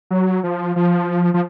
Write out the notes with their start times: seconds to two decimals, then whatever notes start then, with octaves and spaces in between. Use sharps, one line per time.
0.11 F#3
0.43 F3
0.76 F3
1.34 F3